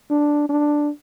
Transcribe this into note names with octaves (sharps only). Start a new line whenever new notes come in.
D4
D4